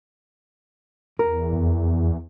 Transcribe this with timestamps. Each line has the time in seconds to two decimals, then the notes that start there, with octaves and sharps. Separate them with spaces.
1.19 E2 A#4
1.52 F2